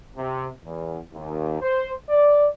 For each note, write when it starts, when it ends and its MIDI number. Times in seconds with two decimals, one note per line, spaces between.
0.17 0.48 48
0.65 0.99 40
1.13 1.59 39
1.62 1.92 72
2.10 2.47 74